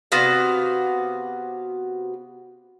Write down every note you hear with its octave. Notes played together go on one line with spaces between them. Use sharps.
C3 B3 F#4 F5